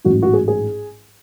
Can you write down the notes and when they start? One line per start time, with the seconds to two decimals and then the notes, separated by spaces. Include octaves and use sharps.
0.05 A1 G#2 F#3 F#4
0.22 F#4
0.33 G#4
0.48 G#4